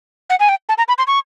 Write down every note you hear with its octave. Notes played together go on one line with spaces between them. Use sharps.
F#5
G#5
G5
A5
A#5
B5
C6
C#6